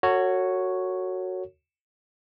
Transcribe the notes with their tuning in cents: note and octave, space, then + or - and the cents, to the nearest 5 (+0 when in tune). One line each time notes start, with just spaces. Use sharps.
F#4 +0 A4 +45 C#5 +0